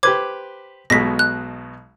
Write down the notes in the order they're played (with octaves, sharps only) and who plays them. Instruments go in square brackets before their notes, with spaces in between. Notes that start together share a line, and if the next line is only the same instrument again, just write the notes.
[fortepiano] G4 B4 C5 [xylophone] D6 G#6
[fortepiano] B1 B2 G#3 [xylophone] A#6 B6
[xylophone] F#6